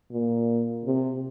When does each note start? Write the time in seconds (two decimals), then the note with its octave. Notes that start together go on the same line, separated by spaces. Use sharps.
0.11 A#2
0.85 C3